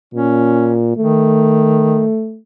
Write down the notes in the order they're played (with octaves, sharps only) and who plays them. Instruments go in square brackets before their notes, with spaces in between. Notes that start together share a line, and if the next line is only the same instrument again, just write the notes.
[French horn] A#2 [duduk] C#4
[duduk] D#3 [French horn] A3